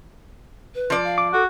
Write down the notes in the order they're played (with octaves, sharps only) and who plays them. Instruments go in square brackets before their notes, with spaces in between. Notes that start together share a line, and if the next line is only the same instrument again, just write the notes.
[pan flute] B4
[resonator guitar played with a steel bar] F3 D5
[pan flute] F5
[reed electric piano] D6
[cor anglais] F#4 [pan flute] A4